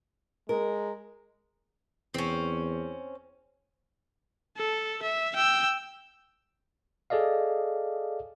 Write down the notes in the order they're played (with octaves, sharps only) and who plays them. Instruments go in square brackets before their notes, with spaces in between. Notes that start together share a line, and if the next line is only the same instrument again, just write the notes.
[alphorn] G#3 [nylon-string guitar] A#4
[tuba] E2 [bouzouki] C4 C#4
[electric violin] A4
E5
G5 E6
[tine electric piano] G#4 A4 D5 D#5 F5